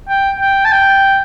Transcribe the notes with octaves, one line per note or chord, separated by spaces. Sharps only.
G5
G5
A5
G5